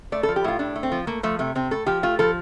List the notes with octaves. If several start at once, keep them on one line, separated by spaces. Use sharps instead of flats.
A3 D5
A4
F3
G4
A2 F4
A2 D4
A3
C4
F3
A3 A#3
F3 A3
C3 A3
C3 C4
A3 A4
F3 G4
A3 F4
F3 A4